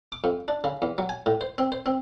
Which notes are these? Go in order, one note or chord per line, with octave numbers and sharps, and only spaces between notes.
D6
F2
D4
C#3
E2
F#3
G#5
A2
C5
C4
C5
C4